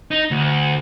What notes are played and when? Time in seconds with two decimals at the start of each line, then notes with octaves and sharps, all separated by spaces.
0.11 D#4
0.31 D2